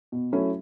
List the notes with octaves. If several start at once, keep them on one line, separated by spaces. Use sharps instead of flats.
B2
F#3 A3 C#4 E4